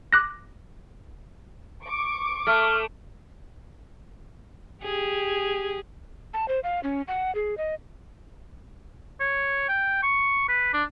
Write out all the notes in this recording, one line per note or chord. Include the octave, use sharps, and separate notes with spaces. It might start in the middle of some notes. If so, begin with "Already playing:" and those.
D6 F#6 A#6
C#6 D6 D7
A3 F6
G4 G#4
A5
C5
F5
C#4
F#5
G#4
D#5
C#5
G5
C#6
B4
D4